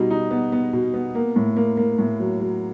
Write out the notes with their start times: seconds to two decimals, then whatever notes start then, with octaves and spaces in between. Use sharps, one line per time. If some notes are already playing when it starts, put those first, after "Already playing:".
Already playing: B2 G3 D#4
0.10 D#4
0.31 B3
0.52 B3
0.73 B2
0.94 B3
1.15 A#3
1.36 A2
1.56 A#3
1.77 A#3
1.99 A2
2.20 F#3
2.40 F#3